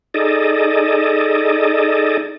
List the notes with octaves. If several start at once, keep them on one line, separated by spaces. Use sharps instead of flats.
D#4 G#4 A4 D5 D#5